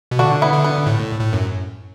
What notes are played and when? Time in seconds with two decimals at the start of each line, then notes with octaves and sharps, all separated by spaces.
0.11 B2
0.19 D3 D4 F#4
0.42 B3 E4
0.53 D3
0.64 B3
0.87 A2
1.20 A2
1.33 F#2